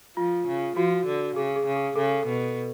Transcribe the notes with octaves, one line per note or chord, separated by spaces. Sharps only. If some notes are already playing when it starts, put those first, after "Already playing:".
F3 F4
C#3
F3 F#4
D3
C#3 G#4
G#4
C#3
G#4
C#3 A4
B2